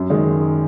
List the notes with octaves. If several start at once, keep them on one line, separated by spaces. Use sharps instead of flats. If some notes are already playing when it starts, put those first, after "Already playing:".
Already playing: F#2
D#3 G#3